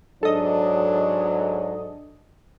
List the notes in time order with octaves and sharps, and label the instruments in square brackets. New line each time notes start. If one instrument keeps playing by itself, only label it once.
[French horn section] G#2 F#3 [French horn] D4 [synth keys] A4 D#5